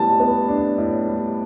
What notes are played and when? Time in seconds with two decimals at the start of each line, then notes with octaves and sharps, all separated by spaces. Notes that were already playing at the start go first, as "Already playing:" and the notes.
Already playing: A2 G3 B3 A5
0.20 B3
0.48 D4
0.78 A2
1.07 G3